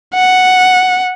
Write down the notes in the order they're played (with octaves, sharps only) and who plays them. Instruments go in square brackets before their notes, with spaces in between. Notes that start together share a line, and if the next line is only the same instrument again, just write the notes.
[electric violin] F#5